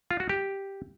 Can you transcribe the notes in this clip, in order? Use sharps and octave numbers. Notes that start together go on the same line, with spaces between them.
F4
F#4
G4